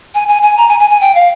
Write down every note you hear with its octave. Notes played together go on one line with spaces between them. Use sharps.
G#5
G#5
G#5
A#5
G#5
G#5
G#5
G5
F5